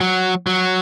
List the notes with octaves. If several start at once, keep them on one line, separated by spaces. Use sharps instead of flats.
F#3
F#3